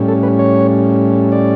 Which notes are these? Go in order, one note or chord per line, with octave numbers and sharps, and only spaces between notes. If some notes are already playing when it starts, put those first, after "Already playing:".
Already playing: A2 G3 C#4
A4
B4
C#5
D5